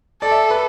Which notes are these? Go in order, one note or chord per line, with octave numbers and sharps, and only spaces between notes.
A4 D5
E5
B4